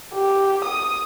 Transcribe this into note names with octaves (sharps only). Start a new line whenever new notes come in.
G4
D#6